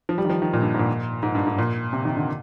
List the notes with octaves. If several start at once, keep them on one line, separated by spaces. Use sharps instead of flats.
F3
G3
D#3
F3
D#3
A#2
G2
G#2
A#2
G#2
G2
G#2
A#2
C3
D#3
D3